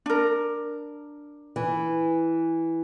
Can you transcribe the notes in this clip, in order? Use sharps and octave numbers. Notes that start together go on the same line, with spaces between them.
D4 A#4
E3